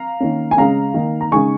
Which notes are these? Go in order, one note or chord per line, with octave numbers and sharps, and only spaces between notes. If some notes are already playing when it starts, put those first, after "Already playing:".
Already playing: F5 A#5
D#3 A#3 C#4
G#5
C#3 G#3 C#4 F5 A#5
D#3 A#3 D#4
A#5
C#3 G#3 D#4 G#5 C#6